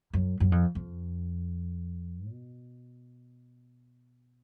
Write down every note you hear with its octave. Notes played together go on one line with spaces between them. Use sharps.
F#2
F#2
F2
F2
B2